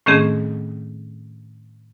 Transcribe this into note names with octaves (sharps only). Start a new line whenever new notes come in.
A2 D#3 A3 C4 C#4 G#4